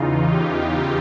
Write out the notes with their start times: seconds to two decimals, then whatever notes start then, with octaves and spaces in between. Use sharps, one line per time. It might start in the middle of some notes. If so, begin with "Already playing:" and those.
Already playing: E2 C#3 E3 D#4 F4
0.31 F4 G4